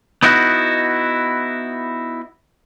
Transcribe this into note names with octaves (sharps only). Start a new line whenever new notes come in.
B3 D#4 E4 F#4